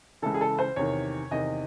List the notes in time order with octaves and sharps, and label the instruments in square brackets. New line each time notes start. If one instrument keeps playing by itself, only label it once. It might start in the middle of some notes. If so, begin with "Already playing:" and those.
[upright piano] C#2 C#3 E3 A4
G#4
A4
C5
E2 C3 D#3 C#5
E2 C3 D#3 D#5